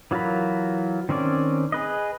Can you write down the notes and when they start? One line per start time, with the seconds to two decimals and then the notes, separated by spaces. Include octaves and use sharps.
0.11 E3 F#3 F4 A#4 B5
1.09 D#3 C4 C#4 D5
1.72 G#4 B4 D#5